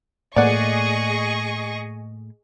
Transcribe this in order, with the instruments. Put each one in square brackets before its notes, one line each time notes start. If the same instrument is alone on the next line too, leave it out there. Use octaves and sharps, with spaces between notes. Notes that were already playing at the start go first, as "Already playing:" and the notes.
[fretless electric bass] A2 A#3 [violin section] G#4 D#5 C#6 [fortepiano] D5 F#5